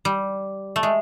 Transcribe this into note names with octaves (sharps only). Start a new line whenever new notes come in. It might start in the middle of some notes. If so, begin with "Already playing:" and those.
G3
A3
G#3